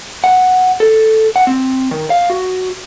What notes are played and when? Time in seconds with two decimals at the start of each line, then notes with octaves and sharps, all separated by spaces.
0.24 F#5
0.80 A4
1.36 F#5
1.47 C4
1.91 D#3
2.10 F5
2.30 F#4